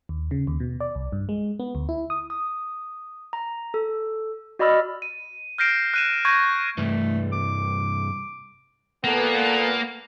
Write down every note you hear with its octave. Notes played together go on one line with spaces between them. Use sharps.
D#2
C#3
D#2
B2
D5
C2
G2
G#3
B3
D2
E4
D#6
D#6
A#5
A4
F#4 D5 D#5 B5 E6 F6
D#7
F6 G6 A#6 C7 D7 E7
F#6 D#7 E7
C#6 G6 G#6 A#6 D#7
C2 G2 E3 A3
D6
A#2 A#3 B3 A4